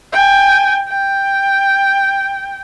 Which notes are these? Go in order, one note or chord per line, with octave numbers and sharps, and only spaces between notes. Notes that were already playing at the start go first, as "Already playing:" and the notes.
G5 G#5
G5